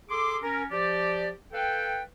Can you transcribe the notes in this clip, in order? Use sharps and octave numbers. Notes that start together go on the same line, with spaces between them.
G#4 A4 C6 D6
C#4 A#4
F3 G4 D5
A4 B4 F5 G5